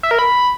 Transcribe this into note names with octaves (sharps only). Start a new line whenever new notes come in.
E5
A#4
B5